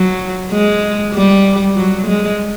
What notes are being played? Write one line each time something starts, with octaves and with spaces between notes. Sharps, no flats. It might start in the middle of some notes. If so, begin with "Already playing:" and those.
Already playing: F#3
G#3
G3
F#3
G#3